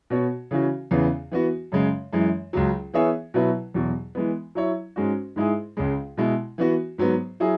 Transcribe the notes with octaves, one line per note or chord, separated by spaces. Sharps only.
B2 B3 F#4 C#5
C#3 E3 C#4 F#4
E2 C#3 E3 B3
E3 B3 F#4
F#2 C#3 G#3
F#2 E3 G#3
C#2 C#3 F#3
E3 B3 G#4 C#5 E5
B2 F#3 E4 B4
E2 B2 F#3
E3 G#3 B3
F#3 E4 C#5
G#2 G#3 C#4 F#4
G#2 G#3 E4 G#4
C#2 C#3 G#3
B2 G#3 E4
E3 B3 F#4
G#2 F#3 B3
F#3 E4 G#4